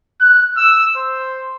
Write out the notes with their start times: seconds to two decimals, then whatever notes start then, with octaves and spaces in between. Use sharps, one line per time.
0.20 F#6
0.57 E6
0.97 C5